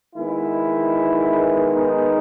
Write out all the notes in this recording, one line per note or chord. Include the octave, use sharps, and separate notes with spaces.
D#3 G#3 B3 E4
D#4